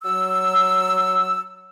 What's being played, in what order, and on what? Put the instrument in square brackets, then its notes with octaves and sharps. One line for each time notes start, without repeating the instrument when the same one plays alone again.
[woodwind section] F#3 E6